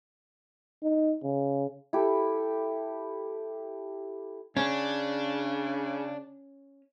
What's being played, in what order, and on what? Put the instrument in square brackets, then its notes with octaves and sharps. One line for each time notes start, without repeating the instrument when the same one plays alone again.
[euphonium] D#4
C#3
[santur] E4 G4 A4
[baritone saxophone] C#3 [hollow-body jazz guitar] C#4 [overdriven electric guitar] D4